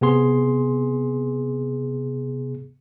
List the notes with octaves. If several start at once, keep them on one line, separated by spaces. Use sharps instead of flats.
C3 B3 G#4 C6